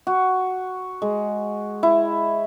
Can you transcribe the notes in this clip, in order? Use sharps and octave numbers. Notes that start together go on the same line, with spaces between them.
F#4
G#3
E4